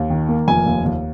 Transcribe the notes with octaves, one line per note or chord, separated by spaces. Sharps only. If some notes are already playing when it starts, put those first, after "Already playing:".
Already playing: D#2
D#3
A#3
F1 G#5
D#2
D#2